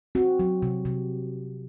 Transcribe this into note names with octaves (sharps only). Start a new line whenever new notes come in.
C4 F#4
F#3
C3
C3